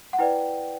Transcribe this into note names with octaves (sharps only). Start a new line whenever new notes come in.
F#5
E4 B4 D5 G5